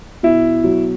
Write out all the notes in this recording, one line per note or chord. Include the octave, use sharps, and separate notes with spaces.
B2 E4
F#3